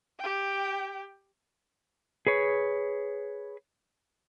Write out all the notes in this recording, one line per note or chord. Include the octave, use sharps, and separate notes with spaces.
G4 G5
G#4 B4 C#5